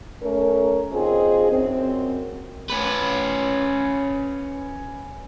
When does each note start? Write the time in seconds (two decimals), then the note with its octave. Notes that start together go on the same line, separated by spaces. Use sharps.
0.23 A3 C#4 A#4
0.93 D#2 C4 F4 G#4 D#5
1.51 F#2 C4
2.70 C#4 B4